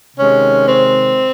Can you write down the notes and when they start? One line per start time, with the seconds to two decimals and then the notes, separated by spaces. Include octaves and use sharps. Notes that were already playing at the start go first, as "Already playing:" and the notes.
0.17 C3 D#3 G#3 C#4
0.64 C4